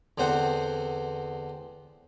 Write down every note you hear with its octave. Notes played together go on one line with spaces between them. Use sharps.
E2 D3 C4 C5 F#5